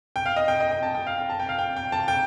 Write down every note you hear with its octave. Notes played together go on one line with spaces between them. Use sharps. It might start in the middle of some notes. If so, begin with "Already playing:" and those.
G5
F5
D#5
G5
D#5
G5
A5
G5
F5
G5
A5
G5
F5
G5
G5
A5
G5